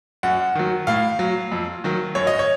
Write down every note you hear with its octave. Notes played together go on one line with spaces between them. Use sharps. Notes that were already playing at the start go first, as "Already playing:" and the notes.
F#2 F#5
D#3 F#3
A2 F5
F#3
F2
D#3 F#3
F#2 C#5
D#5
C#5